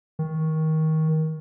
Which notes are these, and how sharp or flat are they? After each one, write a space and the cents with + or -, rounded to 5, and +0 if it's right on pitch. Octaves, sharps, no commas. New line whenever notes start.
D#3 +20